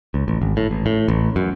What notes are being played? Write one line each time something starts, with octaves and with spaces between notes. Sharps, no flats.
C#2
A1
G#1
A2
A1
A2
A1
F#2